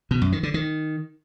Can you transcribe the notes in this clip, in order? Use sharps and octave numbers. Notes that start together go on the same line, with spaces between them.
B2
F#2
D#3
D3
D#3